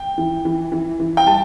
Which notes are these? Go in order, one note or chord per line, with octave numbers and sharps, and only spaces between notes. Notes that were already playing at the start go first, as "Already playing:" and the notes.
Already playing: G5
E3
E3
E3
E3
G5
G3 A5